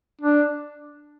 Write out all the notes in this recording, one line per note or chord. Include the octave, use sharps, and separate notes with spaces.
D4